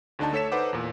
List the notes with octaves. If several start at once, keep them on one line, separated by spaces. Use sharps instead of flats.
D2 D3 D4 D#4 A5
A3 A4 C#5 B6 E7
D#4 A4 B4 C5 F#5 D6
E2 A#2